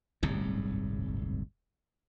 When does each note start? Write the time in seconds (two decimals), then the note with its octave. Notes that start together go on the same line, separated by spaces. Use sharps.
0.23 D1 G1 C2 G#2